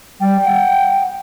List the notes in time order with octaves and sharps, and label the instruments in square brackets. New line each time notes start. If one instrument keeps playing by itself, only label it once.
[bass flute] G3 [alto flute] G5
[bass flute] F#5